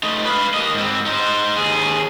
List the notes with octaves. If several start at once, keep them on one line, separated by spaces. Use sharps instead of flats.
A3 D#4
B4 F5
A#3 D#5
G#2 C4
D#4 C5
D#2 G#4